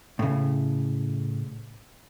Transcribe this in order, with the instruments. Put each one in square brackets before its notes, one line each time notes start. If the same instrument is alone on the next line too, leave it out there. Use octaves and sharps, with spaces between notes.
[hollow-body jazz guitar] A2 C#3